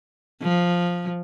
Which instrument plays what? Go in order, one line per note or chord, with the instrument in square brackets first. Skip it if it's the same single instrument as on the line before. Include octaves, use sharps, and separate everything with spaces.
[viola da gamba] F3